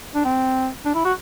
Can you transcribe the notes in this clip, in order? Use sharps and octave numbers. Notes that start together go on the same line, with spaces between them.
D4
C4
D4
E4
F#4